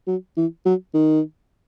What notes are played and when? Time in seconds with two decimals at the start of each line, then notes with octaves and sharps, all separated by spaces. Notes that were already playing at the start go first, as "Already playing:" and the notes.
0.07 F#3
0.37 E3
0.66 F#3
0.94 D#3